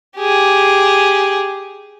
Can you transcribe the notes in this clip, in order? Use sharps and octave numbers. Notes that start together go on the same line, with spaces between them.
G4 G#4